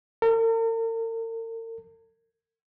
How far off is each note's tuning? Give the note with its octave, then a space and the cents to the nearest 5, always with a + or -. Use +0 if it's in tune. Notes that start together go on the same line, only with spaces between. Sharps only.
A#4 -45